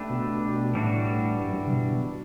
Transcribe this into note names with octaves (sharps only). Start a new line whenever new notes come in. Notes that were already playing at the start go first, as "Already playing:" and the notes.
Already playing: A3 D4 G4 B4
B2
A2 E3 G3 D4 F#4
G2
F#2
G2
C#3
B2